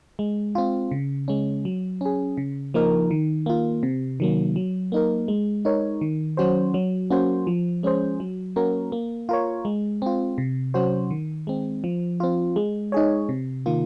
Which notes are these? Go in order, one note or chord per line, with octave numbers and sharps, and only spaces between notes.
G#3
C4 F4
C#3
G#3 C#4
F#3
C#4 G#4
C#3
F3 A#3 D#4 A#4
D#3
A#3 F4
C3
D#3 F#3 A#3
F#3
A#3 D#4 A#4
G#3
D#4 A#4 C#5
D#3
F#3 C#4 F#4 C5
F#3
A#3 C#4 F#4 C5
F3
G#3 C#4 G#4 C5
F#3
A#3 C#4 F#4 A#4
A#3
F4 A#4 C#5
G#3
C4 F4
C3
F#3 C#4 F#4 C5
D#3
G#3 C4
F3
C4 F4
G#3
D#4 G#4 C#5
C3
D#3 A#3 F4